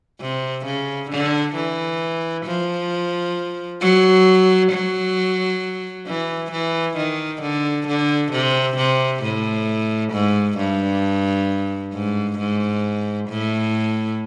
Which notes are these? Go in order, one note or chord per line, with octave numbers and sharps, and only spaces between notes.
C3
C#3
D3
E3
F3
F#3
F#3
E3
E3
D#3
D3
D3
C3
C3
A2
G#2
G2
G#2
G#2
A2